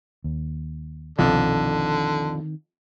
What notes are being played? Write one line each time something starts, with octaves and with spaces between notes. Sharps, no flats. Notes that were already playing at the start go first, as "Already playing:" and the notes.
D#2
C2 F2 B2 D3 D#3 C4